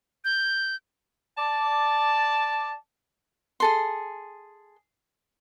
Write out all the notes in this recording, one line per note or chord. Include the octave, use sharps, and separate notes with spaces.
G6
D5 A5
G#4 A4 C6